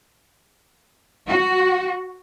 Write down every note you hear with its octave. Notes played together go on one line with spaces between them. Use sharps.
F#4